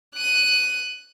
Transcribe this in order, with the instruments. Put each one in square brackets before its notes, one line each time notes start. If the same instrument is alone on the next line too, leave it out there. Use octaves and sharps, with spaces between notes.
[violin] F#6 D#7